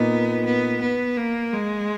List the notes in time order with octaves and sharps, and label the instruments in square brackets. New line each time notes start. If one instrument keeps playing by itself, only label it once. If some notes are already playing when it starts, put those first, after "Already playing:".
Already playing: [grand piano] A#2 A#3 D#4 [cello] B3
[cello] B3
B3
A#3
G#3